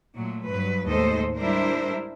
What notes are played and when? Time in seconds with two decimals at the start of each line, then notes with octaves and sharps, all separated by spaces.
0.15 A#2 F#3 A3
0.46 G2 F#3 B4
0.87 D#2 A2 G#3 A4 C5 D#5
1.38 G3 G#3 D4 E4 A#4 C5